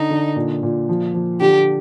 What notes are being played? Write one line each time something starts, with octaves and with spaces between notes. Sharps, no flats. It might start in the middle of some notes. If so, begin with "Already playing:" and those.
Already playing: D3 D#4
D3
A#2
A#2
F3
F3
D3 G4